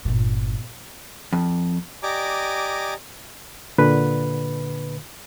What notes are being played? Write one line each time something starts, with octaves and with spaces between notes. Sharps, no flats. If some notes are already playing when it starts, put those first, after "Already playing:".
G1 A#2
F2
G4 D5 D#5 G#5 A#5 D6
A#2 D3 B4